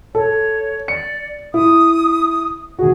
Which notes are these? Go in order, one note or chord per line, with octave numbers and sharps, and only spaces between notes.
A4 C#5
D5 C#7
E4 D#6
D#3 F#4 G#4